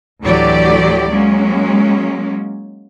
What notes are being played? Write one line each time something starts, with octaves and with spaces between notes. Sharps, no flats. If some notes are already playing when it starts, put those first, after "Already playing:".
D2 A2 E3 F#3 G4 D5
F#3 G#3 A#3 C#4